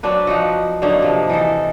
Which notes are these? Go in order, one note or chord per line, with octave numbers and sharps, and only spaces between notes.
F#3 C4 D4 B4
F3 D#4 F#4
D3 F#3 A#3 D#4
C3 F3
E3 D#4 A4